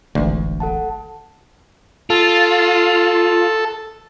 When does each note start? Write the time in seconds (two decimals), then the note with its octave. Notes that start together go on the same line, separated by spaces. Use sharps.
0.15 D1 G#1 D2 E3
0.60 A4 F#5 A5
2.10 F4 A4